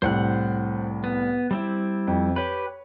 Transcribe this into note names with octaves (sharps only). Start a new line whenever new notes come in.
C2 A2 C5 F#5 F#6
B3
G3 C4 E4
F2
G4 B4 C#5